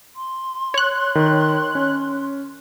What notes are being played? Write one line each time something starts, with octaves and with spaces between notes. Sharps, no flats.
C6
C#5 F#6
D#3
C#4